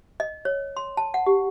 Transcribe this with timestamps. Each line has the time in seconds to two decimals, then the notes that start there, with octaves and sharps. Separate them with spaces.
0.20 D#5
0.45 C#5
0.77 C6
0.97 A5
1.14 F#5
1.27 G4